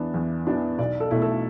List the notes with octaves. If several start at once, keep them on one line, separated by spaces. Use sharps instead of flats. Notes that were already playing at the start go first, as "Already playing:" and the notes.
Already playing: E2 E3 B3 D4
E2
E3 B3 D4
B1 D5
A4
B2 A3 E4
A4